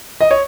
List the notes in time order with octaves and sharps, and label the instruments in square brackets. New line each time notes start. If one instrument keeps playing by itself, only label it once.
[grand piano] D#5
C#5